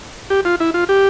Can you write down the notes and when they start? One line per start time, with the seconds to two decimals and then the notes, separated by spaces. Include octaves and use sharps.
0.30 G4
0.45 F4
0.60 E4
0.74 F4
0.89 G4